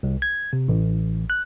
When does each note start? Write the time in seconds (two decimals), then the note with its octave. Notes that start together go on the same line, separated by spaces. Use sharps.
0.03 C2
0.22 G#6
0.53 C3
0.68 A1
1.30 F#6